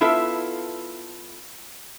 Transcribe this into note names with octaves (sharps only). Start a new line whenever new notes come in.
B3 E4 F4 A4 B4 E5